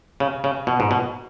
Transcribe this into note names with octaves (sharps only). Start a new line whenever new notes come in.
C#3
C#3
B2
G#2
B2